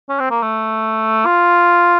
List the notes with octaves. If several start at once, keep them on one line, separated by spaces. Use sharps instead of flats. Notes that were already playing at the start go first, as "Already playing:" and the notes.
C#4
C4
A#3
A3
F4